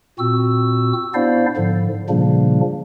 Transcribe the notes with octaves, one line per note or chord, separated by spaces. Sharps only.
A#2 C4 F#4 E6
B3 D4 E4 C5 D5 F5
G#2 D3 F3
A#2 C#3 F3 G3 A#3 D4